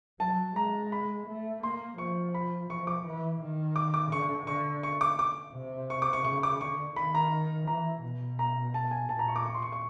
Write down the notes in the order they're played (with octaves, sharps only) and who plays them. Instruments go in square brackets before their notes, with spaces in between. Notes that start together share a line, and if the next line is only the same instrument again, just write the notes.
[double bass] F#3 [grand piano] A5
[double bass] G#3 [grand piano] A#5
[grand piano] B5
[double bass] A3
[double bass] A#3 [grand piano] C6
[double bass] F3 [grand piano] C#6
[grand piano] B5
[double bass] F3 [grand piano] C#6
[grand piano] D6
[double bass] E3
D#3
[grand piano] D6
D6
[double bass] D3 [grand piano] C#6
[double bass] D3 [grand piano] C#6
[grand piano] C#6
D6
D6
[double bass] C3
[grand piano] C#6
D6
C#6
[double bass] C#3 [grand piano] C#6
[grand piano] D6
[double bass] D3 [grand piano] C#6
[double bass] D#3 [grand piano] B5
[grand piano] A#5
[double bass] E3 [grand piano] A#5
[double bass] B2
[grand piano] A#5
A5
G#5
[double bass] A#2 [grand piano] A5
[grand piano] A#5
C#6
D6
C#6
C6
C#6
C#6